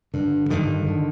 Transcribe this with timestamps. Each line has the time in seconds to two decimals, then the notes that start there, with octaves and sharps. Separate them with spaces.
0.14 G2 D3
0.50 G2 D3 D#3
0.87 D3